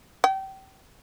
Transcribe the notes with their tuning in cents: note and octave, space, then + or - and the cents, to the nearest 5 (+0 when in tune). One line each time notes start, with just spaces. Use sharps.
G5 -30